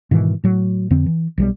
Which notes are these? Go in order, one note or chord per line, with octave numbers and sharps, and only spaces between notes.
G#2 B2 D#3 E3
A2 F#3
F2 D3 C4
E3
B1 F#3 G3